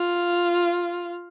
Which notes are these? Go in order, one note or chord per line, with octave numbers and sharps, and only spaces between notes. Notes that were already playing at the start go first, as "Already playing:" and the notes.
Already playing: F4